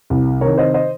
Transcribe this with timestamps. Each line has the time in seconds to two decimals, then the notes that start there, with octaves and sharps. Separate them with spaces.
0.10 C2
0.41 C3 D#3 A#4 C#5
0.57 C5 D#5
0.74 C5 D#5